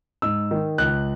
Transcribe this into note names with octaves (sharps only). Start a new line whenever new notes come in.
G#2 E6
D#3
C#2 F#6